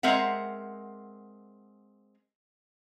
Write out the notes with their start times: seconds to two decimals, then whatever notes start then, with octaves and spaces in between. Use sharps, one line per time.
0.03 G#3 C4 A#4 E5 F#5